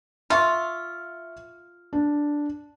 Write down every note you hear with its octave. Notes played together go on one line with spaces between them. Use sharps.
F4 E5 C#6
D4